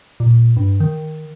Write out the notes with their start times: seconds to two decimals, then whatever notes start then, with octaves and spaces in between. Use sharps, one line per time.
0.20 A#2
0.57 G2
0.80 D#3